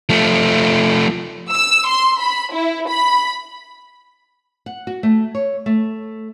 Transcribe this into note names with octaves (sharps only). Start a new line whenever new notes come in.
F3 A3
E6
C6
B5
E4
B5
F#5
F#4
A3
C#5
A3